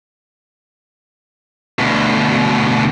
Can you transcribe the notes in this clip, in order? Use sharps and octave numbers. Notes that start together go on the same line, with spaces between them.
D2 B2